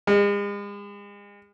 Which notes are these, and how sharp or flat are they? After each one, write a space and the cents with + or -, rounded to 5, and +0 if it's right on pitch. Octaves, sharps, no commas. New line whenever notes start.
G#3 -40